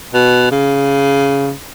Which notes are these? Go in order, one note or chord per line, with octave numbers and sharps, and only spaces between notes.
B2
C#3